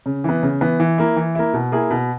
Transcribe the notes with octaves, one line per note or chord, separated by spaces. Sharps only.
C#3
E3 B3
C#3
E3 B3
E3
A#3 E4
E3
A#3 E4
B2
A#3 E4 G#4
B2